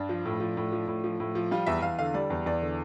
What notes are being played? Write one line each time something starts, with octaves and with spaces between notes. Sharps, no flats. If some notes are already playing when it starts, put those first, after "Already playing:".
Already playing: G2 D4
F3
A2
F3
A2
F3
A2
F3
A2
F3
G3 F4
E2 E5
E2 F5
D3 F5
G3 D5
E2
E2 D5
D3